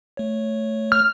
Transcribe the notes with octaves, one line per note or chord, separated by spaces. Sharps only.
A3 C#5
F6